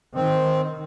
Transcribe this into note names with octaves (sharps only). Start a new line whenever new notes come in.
D#3 C4